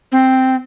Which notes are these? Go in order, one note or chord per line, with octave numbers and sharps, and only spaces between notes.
C4